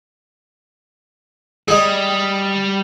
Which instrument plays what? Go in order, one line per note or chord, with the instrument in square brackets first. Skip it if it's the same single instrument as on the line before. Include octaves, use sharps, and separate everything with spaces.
[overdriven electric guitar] G3 [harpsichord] G#4 D#5